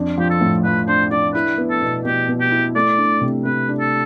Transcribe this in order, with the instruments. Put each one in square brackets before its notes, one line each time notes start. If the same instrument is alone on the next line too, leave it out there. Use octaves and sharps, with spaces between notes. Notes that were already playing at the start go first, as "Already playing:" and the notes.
Already playing: [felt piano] F2 D4
[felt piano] F3 [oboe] G4
[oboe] A4
[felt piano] A2
[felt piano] F3 [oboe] B4
[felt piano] D4 [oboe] C5
[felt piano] D4 [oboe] D5
[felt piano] E4 [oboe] B4
[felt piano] B3
[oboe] A4
[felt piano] B2
[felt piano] B2 [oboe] G4
[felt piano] B2
[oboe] G4
[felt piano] E4
[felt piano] A3 [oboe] D5
[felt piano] D4
C3
[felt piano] A3 [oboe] B4
[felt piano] D4
[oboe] A4